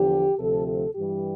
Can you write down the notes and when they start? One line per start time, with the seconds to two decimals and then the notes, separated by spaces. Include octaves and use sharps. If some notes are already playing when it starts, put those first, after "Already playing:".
Already playing: E2 D3 F3 G4
0.39 D2 C3 F3 A4
0.67 A4
0.95 G2 E3 G3 G4